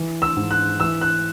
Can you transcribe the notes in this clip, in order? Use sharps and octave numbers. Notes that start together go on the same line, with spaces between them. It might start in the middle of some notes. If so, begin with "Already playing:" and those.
Already playing: E3
E6
G#2
F#6
E3 E6
F#6